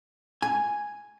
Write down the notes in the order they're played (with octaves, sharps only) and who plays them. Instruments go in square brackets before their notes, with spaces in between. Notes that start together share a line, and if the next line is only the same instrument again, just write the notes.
[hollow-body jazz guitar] G#5